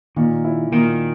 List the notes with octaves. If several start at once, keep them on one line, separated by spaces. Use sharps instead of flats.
A#2 D#3
E4
A#2 D#3